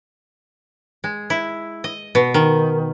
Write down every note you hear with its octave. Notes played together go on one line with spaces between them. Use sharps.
G#3
E4
D#5
B2
D#3